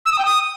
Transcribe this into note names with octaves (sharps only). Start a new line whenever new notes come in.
E6
D#6
G5
D#6